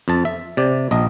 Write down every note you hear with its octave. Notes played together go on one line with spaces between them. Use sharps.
F2 A5
E5
C3 D5
A#1 D#5